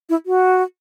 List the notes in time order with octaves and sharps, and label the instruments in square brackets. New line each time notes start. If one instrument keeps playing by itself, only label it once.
[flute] E4
F#4